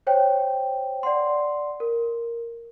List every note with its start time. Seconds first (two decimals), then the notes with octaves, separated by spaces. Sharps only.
0.07 C5 C#5 G5
1.03 D5 F#5 C6
1.80 A#4